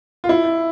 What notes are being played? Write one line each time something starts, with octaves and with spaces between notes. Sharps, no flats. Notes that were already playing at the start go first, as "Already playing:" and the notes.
F4
E4